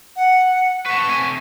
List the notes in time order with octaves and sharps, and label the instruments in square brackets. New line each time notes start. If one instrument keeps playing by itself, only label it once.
[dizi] F#5
[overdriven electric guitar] B4 A5 [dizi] C#6
[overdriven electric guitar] C3 G#5